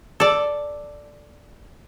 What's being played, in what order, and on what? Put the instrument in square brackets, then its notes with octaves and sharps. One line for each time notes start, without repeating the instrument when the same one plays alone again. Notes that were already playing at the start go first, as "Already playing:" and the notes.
[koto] A4 D5